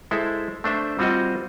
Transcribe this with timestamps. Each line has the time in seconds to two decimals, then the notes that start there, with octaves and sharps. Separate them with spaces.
0.11 G#3 E4 A4 C5 E5
0.64 A3 D4 C5 E5
0.99 G3 C4 F4 F#4 C5 D#5